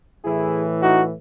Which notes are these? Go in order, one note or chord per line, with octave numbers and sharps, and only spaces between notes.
A2 E3 E4 G#4
D#4 F#4